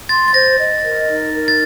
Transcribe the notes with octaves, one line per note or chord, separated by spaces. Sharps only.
C6 A6
A6
C5 A#6
D#5
A#4
D#4
A#4
A6